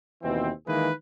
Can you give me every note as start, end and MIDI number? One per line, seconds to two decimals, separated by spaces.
0.22 0.51 39
0.22 0.51 47
0.22 0.51 52
0.22 0.51 60
0.67 0.90 51
0.67 0.90 52
0.67 0.90 56
0.67 0.90 58
0.67 0.90 68
0.67 0.90 71